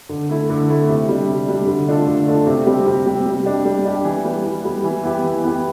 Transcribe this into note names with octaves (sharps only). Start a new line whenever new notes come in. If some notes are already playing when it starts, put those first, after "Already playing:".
D3
A3 E4
D3
A3 E4
C3
G3 D4
C3
G3 D4
D3
A3 D4 F4 A4
D3
A3 D4 F4 A4
C3
G3 C4 G4
C3
G3 C4 G4
G3
D4 G4
G3
D4 G4
E3
G3 B3
E3
G3 B3
E3
B3 E4 G4
E3
B3 E4 G4